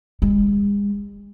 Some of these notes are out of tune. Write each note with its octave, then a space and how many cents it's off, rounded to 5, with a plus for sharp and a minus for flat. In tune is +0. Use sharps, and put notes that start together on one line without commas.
G#3 -40